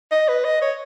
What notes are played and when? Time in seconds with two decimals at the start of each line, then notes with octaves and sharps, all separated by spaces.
0.12 D#5
0.28 B4
0.44 D#5
0.61 C#5